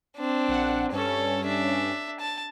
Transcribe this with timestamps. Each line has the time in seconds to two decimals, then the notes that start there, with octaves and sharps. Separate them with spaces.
0.17 C4 D4
0.48 A#1 F#5
0.92 G2 C#4 A4 C#5
1.45 D4 E5
2.20 A5